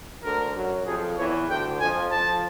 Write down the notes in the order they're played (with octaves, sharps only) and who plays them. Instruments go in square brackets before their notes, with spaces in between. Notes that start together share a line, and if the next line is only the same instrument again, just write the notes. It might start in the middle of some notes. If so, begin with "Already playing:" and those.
[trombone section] D2 D3 [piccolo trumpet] A#4
[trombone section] F#2 F#3
[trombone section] F2 F3 [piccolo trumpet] G#4
[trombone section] E2 E3 [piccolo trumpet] C#5
[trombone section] D2 D3 [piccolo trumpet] G5
[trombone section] F2 F3 [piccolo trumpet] G#5
[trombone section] F2 F3 [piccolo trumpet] A5